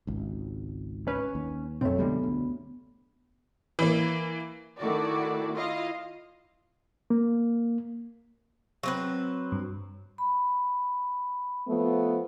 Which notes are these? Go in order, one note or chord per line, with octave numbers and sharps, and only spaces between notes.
G#1 C#2
C#4 B4
D#2
B1 F#2 A3 C4 C#5
D3 G3 G#3 B3
D2
E3 A#3
D#3 A3 E4 F#4 D5
E4 F4 D#5 F5
A#3
F#3 C4 B4
G2
B5
F3 A3 B3